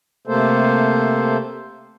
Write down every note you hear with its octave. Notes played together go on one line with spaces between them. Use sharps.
C3 A3 A#3 A4 C5